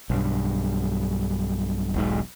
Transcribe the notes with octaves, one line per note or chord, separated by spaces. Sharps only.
B1 G2
E1 B1 G#2